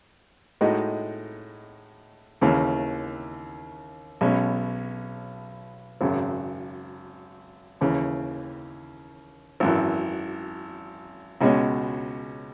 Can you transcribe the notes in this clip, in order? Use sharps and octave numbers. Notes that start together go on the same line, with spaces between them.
A2 G#3 D#4 F#4
D#2 C#3 E3
B1 B2 G#3 C#4
G#1 F#2 C#3
D#2 C#3 E3
G#1 F#2 E3
C#2 B2 G#3 C#4